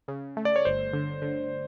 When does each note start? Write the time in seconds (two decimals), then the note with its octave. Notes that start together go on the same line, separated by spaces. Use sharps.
0.08 C#3
0.37 A3
0.45 D5
0.56 C#5
0.65 G1 C5
0.93 D3
1.22 D3